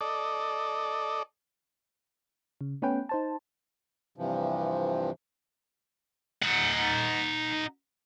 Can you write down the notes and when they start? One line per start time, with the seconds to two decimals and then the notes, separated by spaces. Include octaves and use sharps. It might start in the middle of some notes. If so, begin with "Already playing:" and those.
0.01 A4 D5 D#5
2.61 C#3
2.82 A3 B3 C#4 B4 G5
3.09 D#4 C5 A5
4.16 G2 C3 E3 F3
6.43 D#4 F#5